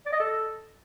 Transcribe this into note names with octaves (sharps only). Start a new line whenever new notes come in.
D5
D#5
A4